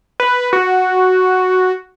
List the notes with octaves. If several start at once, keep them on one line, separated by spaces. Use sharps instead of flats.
B4
F#4